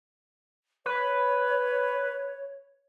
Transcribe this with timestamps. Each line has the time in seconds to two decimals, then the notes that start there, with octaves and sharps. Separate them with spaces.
0.86 B4 C#5